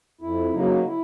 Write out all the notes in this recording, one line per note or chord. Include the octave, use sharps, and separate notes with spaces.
F2 E4
C#3 F#3 A#3 D#4
E4